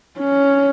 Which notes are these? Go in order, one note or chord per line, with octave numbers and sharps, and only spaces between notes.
C#4